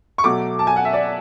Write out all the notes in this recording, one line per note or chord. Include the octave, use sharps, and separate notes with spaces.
C#6
B2 F#3 A3 D6
A5
G#5
F#5
E5
D5